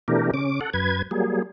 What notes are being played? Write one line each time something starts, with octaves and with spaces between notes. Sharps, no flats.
B2 E3 A3 D4 G4 A#4
C#3 C#4 D6
A4 F#5
F#2 B4 G#6
F#3 G3 A#3 G#4